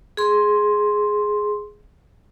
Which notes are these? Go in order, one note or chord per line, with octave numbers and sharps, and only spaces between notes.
G#4 C6